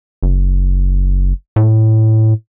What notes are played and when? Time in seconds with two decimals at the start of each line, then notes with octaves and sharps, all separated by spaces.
0.23 F#1
1.56 A2